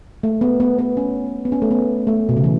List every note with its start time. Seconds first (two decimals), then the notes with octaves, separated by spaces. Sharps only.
0.23 A3
0.41 B3
0.60 B3
0.79 B3
0.97 C#4
1.45 B3
1.52 C#4
1.62 A3
1.71 B3
2.07 A3
2.29 B2
2.37 C#3
2.44 E3